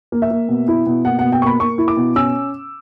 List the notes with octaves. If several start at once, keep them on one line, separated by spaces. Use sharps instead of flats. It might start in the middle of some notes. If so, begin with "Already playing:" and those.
A#3
E5
A#3
B2
E4
B2
A#3 F#5
B2 F#5
G5
A#3 B5 C#6
A#3 C#6
E4
D6
B2
C#4 E6